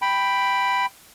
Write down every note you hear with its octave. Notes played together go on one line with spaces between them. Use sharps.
G5 B5